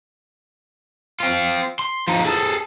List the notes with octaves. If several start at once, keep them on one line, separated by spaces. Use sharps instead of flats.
C4 F4
C6
F3 D#4
G#4 A4